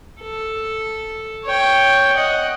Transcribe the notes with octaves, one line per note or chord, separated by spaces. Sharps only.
A4
C#5 G5
D#5 F#5